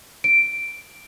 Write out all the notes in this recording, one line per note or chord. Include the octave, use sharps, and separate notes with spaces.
D7